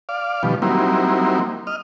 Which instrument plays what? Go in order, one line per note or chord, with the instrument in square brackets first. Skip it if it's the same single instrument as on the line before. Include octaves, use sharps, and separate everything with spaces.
[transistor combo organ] D5 F5
B2 D#3 F3 G3
F#3 G3 A#3 C4 D#4 E4
D#5 F6